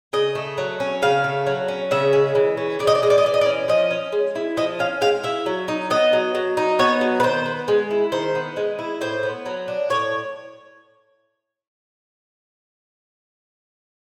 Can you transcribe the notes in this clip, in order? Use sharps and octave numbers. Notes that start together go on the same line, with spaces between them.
C#3 D#5
A3
F#3
C#4
C#3 F5
A3
F#3
C#4
C#3 E5
G#3
E3
C#4
C#3 D5
D#5
D5
G#3 D#5
D5
D#5
E3 D5
D#5
D5
C#4
F3 D#5
C#4
G#3
E4
F3 D#5
C#4 F5
G#3 F5
E4 E5
F#3
D#4
B3 D#5
F#3
F#3
D#4
B3 C#5
F#3
B4
D#3 C5
B3
G#3
E4
D#3 C5
B3
G#3
E4
A2 C5
B3
F#3
D4
A2 C#5